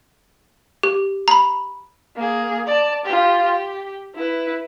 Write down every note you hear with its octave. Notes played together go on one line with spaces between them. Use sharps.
G4
A#5 B5
A#3 G#4
D5 A5
F4 G4
G4
E4 B4